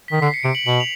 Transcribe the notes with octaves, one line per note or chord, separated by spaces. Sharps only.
B6
D#3
D3 C7
C#7
C3 D7
F#7
B2 F#7
F7